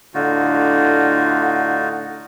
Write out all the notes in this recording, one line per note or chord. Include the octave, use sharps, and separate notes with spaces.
A2 D3 D#4 F4 F#4